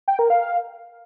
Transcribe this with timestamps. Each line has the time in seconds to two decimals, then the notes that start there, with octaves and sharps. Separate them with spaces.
0.08 G5
0.19 A#4
0.30 F5